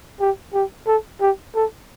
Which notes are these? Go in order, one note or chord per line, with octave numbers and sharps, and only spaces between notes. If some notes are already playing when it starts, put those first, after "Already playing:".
G4
G4
A4
G4
A4